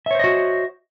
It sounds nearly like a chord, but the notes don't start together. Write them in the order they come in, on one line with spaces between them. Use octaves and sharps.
E5 C#5 C5 D#5 F#4